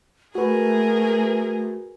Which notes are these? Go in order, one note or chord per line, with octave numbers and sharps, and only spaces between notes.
A3 F#4 G#4 A#4 B4